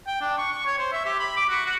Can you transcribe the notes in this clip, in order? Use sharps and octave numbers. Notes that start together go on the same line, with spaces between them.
G5
D4
C#6
C#6
C#5
C5
E5
G4
B5
D6
F#4
F#4